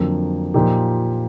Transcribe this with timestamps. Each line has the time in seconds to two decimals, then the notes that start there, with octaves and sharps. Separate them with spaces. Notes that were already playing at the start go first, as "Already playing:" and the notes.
Already playing: F2 D3 F#3 A#3
0.54 A#2 F3 A#3 D#4 G4